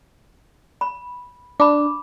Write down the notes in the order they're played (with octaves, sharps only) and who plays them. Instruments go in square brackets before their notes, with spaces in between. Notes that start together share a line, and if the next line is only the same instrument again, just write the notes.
[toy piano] B5
[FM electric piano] D4 [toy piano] B5 D6